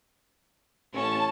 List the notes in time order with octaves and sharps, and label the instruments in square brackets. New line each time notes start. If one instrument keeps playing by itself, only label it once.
[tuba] A1 [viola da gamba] C#4 [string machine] A5